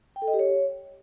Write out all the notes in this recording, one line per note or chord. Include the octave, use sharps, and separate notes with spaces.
G5
A4
D#5
G4
C#5